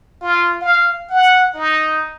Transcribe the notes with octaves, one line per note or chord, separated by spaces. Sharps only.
F4
F5
F#5
D#4